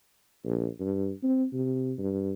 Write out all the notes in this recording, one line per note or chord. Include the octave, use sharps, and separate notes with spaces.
A#1
G2
C4
C3
G2